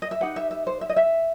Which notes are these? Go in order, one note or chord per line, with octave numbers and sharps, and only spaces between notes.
D#5
E5
D#4 G4 B4 F#5
E5
E5
C5
E5
D#5
E5